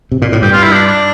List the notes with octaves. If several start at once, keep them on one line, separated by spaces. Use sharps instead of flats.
C3
A#2
A2
G2 G4
F4
E4
D4
D4